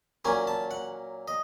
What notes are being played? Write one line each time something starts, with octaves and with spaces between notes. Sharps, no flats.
A#2 F#3 A#3 C#4 G#5
A5
F#5
D#5